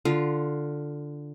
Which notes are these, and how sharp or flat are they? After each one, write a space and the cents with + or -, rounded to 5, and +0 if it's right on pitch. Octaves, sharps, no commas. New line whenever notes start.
D3 +0 F4 +0